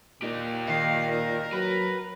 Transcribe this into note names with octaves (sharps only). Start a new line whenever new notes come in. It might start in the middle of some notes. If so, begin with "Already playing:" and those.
A#2 D#4 G4
D#3 F5
A#4
F#3 B4